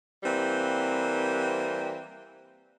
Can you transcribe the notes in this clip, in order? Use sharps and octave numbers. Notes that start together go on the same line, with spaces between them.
E3 G3 A#3 C4